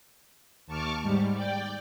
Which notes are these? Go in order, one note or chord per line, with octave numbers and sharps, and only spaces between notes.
D#2 A5 C#6 D6 F6
G#2 G3
D5 G5